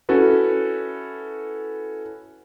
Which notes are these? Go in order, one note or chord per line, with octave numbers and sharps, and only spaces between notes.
C#4 E4 F#4 A4 B4